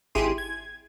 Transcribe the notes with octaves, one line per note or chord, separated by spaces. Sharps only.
G#1 E4 G4 G#4 C6 D#7
G#6